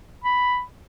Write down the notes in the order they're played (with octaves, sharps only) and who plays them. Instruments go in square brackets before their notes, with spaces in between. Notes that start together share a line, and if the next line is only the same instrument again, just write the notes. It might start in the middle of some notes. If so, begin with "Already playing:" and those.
[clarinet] B5